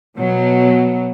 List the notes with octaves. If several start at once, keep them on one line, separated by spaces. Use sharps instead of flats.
B2 F#3